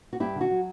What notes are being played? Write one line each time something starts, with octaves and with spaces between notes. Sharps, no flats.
F#4
G2 E4 G4
D3
F#4
F#3